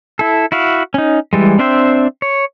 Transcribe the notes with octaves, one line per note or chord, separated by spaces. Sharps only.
E4 A4
E4 F#4 F5
C#4 D#4
E3 G3 G#3
C4 D4 C5 E5 G5
C#5